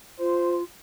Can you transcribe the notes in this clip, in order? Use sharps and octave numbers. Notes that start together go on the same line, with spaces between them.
F4 C5